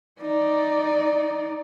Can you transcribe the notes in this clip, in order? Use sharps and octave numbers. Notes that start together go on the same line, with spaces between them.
D#4 D5